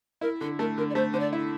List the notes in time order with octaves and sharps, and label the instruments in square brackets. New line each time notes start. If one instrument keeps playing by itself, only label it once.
[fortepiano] E4 [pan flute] A#4
[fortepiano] D3 [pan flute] A4
[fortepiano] A3 [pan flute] A#4
[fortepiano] D3 [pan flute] A#4
[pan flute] D5
[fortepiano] A3 [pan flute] C5
[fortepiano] D3 [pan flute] C5
[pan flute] D5
[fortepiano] E4